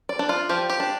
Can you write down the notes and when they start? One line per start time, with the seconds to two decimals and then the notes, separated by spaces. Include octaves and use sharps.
0.09 D5
0.19 D4
0.29 F4
0.49 F3 G4
0.70 G4
0.80 D4